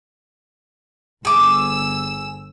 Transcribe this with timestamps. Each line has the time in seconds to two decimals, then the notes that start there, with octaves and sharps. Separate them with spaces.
1.25 G1 G#4 D6 E6